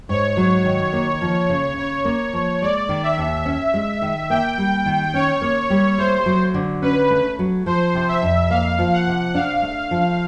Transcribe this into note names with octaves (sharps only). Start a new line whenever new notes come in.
G#2 C#5
F#3
D#3
A#3
F3
C#3
C#3 C#5
A#3
F3
G#3 D5
D#3
E5
D#2
C#4
G#3
D#3
A#3 G5
G3
D#3
C#4 C#5
A#3
G3
A3 C5
F#3
D3
C#4 B4
A3
F#3
F3 C5
C3
E5
F2
A#3 F5
F3
F#5
C3
D4 F5
A3
F3